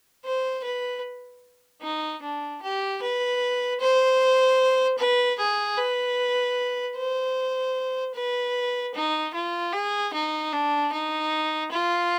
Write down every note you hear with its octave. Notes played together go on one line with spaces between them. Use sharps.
C5
B4
D#4
D4
G4
B4
C5
B4
G#4
B4
C5
B4
D#4
F4
G#4
D#4
D4
D#4
F4